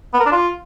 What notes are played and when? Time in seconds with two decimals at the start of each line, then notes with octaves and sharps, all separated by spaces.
0.14 B3
0.20 A#4
0.26 D4
0.32 F4